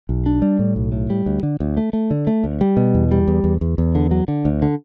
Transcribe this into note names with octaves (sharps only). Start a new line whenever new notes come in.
B1
D4
G3
A2
B1
A2
G3
D2
D3
D2
A3
A3
D3
A3
D2
G3
B2
E2
G3
E2
E2
E2
E2
D3
F#3
D3
D2
D3